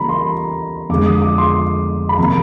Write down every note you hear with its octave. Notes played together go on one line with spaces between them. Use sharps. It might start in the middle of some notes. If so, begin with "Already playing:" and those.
Already playing: C#3 E3 G3 A#3 A#5 B5
C6
F2 D3 F3 G#3 D6
D#6
D6
C6
B5
C3 F3 A#3 A#5